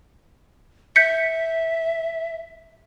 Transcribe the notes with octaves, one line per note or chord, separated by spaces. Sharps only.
E5 G6 B6 C#7